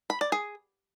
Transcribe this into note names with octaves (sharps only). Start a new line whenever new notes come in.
B5
D5
G#4